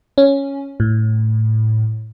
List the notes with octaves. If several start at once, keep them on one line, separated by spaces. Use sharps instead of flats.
C#4
A2